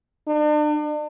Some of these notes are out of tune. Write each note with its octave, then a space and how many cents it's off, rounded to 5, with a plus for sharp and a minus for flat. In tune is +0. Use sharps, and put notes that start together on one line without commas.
D4 +40